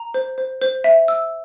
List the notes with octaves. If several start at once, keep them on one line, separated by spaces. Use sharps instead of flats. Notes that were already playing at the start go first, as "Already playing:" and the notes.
Already playing: A#5
C5
C5
C5
E5
E6